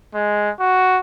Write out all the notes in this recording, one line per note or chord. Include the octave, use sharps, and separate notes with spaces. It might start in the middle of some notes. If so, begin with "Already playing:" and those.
G#3
F#4